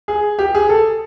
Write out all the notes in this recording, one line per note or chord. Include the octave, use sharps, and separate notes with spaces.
G#4
G4
G#4
A4